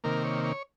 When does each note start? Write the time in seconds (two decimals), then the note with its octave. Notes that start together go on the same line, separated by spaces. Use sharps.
0.04 C3 D#3 A#3 A#4
0.24 C#5
0.44 C#5